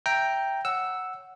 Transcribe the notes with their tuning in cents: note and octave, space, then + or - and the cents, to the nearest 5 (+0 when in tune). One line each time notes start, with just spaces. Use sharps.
E5 +5 G5 +0 A#5 +0
C#5 +0 F#5 +0 E6 +0